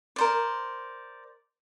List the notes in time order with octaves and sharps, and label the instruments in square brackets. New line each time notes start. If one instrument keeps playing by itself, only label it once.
[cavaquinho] A#4 C5 D5